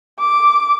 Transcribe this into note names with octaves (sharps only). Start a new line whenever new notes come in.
D6